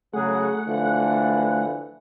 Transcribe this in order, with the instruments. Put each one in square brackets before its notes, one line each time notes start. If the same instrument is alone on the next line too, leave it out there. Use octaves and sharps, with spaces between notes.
[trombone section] C#3 F#3 G#4 [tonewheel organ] A3 F#5
[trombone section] D3 E3 F3